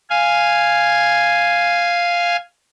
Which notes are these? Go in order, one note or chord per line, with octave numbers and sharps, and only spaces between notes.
F5 G#5